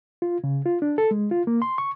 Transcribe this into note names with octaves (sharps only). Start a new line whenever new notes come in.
F4
C#3
F4
D4
A4
G#3
F4
A#3
C6
C#6